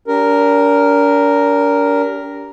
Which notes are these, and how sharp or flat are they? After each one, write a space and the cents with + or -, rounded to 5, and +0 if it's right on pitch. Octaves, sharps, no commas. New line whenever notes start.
D4 -40 G4 +0 A#4 +0